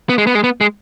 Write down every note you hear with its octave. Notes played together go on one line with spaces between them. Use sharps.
B3
G#3
B3
G#3
B3
G#3